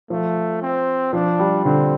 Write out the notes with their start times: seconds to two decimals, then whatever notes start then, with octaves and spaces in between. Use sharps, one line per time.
0.10 F3 A3
0.62 C4
1.13 F3 D4
1.39 G3
1.65 D3 C4